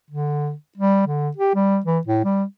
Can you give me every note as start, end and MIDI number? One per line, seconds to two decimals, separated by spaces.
0.10 0.53 50
0.77 1.02 55
1.07 1.29 50
1.36 1.55 67
1.55 1.79 55
1.85 1.99 52
2.07 2.21 45
2.24 2.44 55